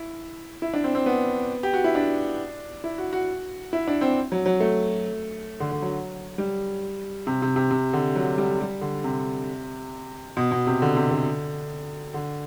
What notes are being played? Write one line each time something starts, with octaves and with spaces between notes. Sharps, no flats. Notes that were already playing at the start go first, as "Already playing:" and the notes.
Already playing: E4
E4
D4
C4
C4
B3
G4
F#4
E4
D4
E4
F#4
F#4
E4
D4
C4
F#3
F#3
A3
D3
D3
F#3
G3
C3
C3
C3
C3
D3
F#3
G3
G3
D3
C3
B2
B2
C3
D3
C3
D3
D3